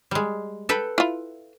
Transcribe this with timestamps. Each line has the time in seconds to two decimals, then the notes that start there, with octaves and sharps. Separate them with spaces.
0.11 G3 G#3
0.69 A4 B4 G5
0.98 E4 F4